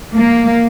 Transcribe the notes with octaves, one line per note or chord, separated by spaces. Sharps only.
A#3